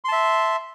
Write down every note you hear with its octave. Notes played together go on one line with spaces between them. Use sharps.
E5 A5 C6